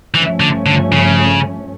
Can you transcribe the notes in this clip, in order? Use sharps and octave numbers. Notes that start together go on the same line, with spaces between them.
G2 E3 F3 A3 C#4
D3
D3
C#3